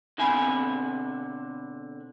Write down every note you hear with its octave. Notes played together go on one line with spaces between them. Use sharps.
B2 D3 C4 E5 G#5 B5